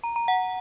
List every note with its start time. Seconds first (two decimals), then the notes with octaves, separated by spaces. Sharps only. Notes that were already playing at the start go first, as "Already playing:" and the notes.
0.03 A#5
0.16 A#5
0.28 F#5